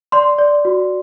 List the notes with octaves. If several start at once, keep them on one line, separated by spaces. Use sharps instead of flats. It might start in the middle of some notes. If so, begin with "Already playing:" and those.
D5 C6
D5
F#4